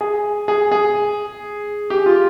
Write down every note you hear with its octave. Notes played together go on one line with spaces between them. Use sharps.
G#4
G#4
G#4
G4
F4